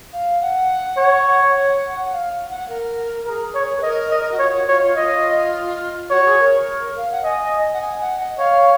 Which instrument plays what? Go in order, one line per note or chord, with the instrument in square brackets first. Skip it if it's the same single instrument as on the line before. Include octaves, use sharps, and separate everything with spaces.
[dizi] F5
F#5
[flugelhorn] C#5
[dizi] F#5
F5
F#5
A#4
[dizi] G#4 [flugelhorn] A#4
[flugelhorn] C#5
[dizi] B4
[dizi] A#4 [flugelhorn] D#5
[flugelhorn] D#5
[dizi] F#4
[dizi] F4 [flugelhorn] C#5
[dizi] F#4
[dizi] F4 [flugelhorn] C#5
[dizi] F4
[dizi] F4 [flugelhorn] D#5
[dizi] F#4 [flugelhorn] C#5
[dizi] G#4
A#4
A#4
F5
F#5
[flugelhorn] D#5 [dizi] G#5
[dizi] F#5
G#5
F#5
D#5
[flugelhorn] C#5 [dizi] F5